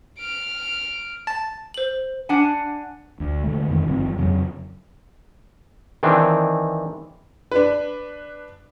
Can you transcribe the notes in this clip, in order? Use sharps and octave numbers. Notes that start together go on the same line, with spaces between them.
F6 D7
A5
C5 F#7
D4 F#5 G#5
D2
D3 G#3 A3
F2 D3 D#3
G#1 G2 F3 C4
F2 C#3 F#3
D#3 E3 C4 D4
D4 B4